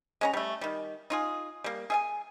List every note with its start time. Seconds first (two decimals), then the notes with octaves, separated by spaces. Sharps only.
0.21 G#3 C#4 A#5
0.33 G3 A3
0.61 D#3 G3
1.10 D#4 F4 G#4
1.64 G3 A#3
1.90 G#4 E5 G#5